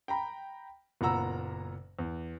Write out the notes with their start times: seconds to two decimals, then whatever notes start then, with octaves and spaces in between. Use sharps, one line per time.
0.08 G5 A#5 B5
1.01 F#1 A#2 B3 F#5 A#5 E6
1.99 E2